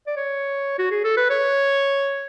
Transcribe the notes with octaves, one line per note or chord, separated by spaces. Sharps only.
D5
C#5
F#4
G#4
A4
B4
C#5